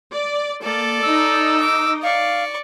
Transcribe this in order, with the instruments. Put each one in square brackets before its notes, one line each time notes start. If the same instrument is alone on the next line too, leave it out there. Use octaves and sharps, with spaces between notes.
[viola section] D5
[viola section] A#3 [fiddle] A4 D5
[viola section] D#4 D#5 [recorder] E6
[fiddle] D6
[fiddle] D5 C#6 [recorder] F5